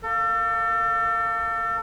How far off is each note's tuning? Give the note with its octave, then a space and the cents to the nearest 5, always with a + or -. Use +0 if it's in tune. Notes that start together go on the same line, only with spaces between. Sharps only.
A#3 +0 A4 +35